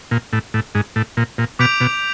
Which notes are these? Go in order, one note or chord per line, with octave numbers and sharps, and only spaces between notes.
A#2
A2
A2
G#2
A2
A#2
A#2
B2 D6 G6 B6 D7 F7
B2